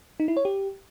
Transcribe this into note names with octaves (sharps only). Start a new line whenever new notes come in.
D#4
E4
C#5
G4